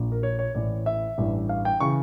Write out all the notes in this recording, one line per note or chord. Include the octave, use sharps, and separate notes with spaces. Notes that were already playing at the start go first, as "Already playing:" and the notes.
Already playing: A#1 A#2
A#4
C#5
C#5
A1 A2 E3 D5
E5
A1 G2 E3
F5
G5
C#3 E3 C#6